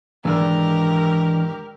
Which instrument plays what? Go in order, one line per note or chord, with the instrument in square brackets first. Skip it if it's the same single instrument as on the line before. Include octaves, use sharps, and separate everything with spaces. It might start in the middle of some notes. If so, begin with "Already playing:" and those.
[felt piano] G#2 D#3 E6 [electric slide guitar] E3 D4 D5 [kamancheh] G4 A#4